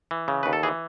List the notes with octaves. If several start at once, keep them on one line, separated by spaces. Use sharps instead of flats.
E3
C#3
D#2 B4
A4
E3 G#4